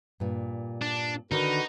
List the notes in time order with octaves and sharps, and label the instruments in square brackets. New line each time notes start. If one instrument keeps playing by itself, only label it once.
[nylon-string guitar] G2 A#2
[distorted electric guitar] D4
[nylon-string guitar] D3 D#3 D4 [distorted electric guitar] D#4 [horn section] F#4 A#4 B4